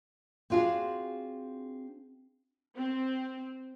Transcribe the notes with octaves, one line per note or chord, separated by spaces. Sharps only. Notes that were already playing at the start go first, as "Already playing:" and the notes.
C4 D4 F4 F#4 G#4
C4